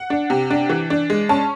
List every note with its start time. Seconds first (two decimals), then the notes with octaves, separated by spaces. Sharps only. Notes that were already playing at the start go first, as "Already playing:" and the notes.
Already playing: F#5
0.10 D4
0.30 C3
0.51 D4
0.69 E3
0.90 D4
1.10 G#3
1.29 C#4 A5